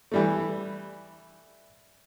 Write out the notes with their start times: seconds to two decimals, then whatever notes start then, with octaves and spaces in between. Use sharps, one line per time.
0.12 E3 G3 A3